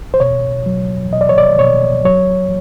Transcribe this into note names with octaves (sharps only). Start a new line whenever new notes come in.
C5
B2 C#5
F#3
B2 D#5
D5
C#5
D5
B2 C#5
F#3 C#5